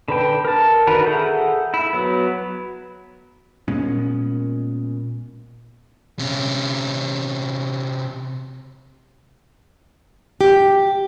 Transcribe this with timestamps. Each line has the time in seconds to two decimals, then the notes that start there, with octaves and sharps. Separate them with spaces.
0.08 D3 B4 G5
0.45 A#4 A5
0.87 D3 D#3 F#4 A#4 B4
1.06 G#4 A4 E5 F#5 G6
1.74 E4
1.93 F#3 B3
3.68 A#2 G#3 B3 C#4
6.19 C3 C#4
10.41 G4